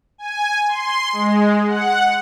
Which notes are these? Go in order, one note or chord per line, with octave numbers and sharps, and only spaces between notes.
G#5
C6
G#3
F#5